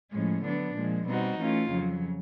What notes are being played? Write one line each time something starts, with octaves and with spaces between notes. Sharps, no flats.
A2 F3 G#3 C#4
D3 F#3 B3 D4
A#2 F3 G#3
B2 G3 C4 D#4 F#4
E3 A3 C#4 F4
F2 C#3 F#3